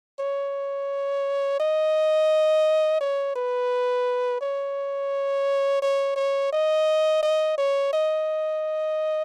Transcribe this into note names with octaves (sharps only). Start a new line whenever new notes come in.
C#5
D#5
C#5
B4
C#5
C#5
C#5
D#5
D#5
C#5
D#5